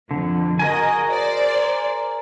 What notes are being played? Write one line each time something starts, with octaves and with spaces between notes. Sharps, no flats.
F2 D3
F#4 G#4 A#4 D#5 G#5
C5 D5